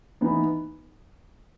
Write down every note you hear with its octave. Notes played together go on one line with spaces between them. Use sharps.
E3 B3 D#4